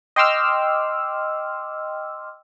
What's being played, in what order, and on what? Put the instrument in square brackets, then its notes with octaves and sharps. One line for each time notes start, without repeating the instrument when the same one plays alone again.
[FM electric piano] D#5 G5 C6 D6 E6 F6